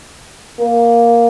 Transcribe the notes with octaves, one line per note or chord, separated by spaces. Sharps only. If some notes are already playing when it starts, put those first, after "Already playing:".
A#3